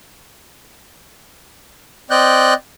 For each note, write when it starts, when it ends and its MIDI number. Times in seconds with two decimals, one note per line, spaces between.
2.10 2.54 60
2.10 2.54 74
2.10 2.54 75
2.10 2.54 90
2.10 2.54 91